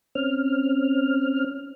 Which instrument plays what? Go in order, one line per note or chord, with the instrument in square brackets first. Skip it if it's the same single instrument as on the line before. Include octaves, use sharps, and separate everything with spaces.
[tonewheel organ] C4 C#4 F6